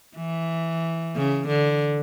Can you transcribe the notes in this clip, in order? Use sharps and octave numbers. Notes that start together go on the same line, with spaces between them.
E3
C#3
D3